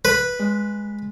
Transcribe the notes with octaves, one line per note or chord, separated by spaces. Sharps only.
B4
G#3